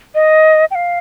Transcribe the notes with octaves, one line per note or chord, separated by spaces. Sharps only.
D#5
G5
F5